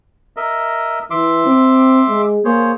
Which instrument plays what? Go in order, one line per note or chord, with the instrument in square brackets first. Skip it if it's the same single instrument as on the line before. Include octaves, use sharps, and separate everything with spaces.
[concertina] A#4 D#5 E5
[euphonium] E3 [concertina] E5 C6 D6
[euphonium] C4
G#3
[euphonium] A#3 [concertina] G#4 C5 C#5